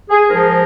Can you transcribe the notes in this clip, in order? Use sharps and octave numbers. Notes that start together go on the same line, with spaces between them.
G#4
G#2 F3 A#4